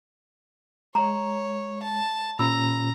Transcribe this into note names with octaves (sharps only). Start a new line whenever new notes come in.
G#3 C#5 A#5 C6
A5
A#2 C#4 A#5 B5 E6